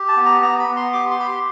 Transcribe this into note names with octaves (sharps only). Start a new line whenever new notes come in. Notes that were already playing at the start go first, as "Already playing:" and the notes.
Already playing: G4
A5
B3
A#5
B3 A#5
B5
B3
C6
G4 D6
C6
G4 B5
C6